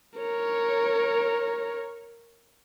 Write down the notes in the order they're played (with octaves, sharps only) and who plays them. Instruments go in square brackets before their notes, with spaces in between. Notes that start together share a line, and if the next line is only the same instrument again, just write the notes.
[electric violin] A#4 C#5